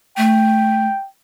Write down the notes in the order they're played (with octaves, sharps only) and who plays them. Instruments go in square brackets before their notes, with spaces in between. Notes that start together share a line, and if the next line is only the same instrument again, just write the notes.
[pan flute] A3 [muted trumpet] G5